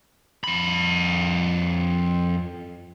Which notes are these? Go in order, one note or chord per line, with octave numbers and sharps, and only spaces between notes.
F2 B5